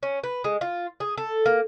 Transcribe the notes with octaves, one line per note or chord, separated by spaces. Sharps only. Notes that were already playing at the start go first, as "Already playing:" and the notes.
C#4
B4
G#3
F4
G#4
A4
A#3